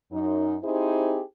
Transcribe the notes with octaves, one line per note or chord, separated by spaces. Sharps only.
F#2 D#4
C4 D#4 E4 G4 G#4 C5